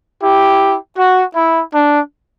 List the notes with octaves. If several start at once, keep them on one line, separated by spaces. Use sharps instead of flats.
E4 G4
F#4
E4
D4